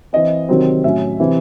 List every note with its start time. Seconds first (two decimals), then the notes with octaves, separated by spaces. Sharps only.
0.13 E3 C4 D#5
0.49 C3 D#3 F#3 C4
0.84 A2 F#3 C#4 E5
1.20 C3 E3 C4